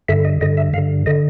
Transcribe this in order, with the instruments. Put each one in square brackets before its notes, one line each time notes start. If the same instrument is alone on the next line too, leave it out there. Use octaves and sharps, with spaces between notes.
[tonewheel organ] G2 D3 E5
D#5
G2 D3 D#5
E5
G2 F5
D3
D3 D#5